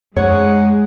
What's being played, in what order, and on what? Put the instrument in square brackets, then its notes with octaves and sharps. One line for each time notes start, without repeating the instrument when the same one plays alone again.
[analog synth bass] F#2 [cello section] G#3 [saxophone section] D#4 G#4 F#5 [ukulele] C#5